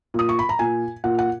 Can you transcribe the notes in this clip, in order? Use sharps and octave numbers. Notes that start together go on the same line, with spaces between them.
A#2 D#6
C#6
B5
A#5
A#2 G#5
A#2 F#5
F#5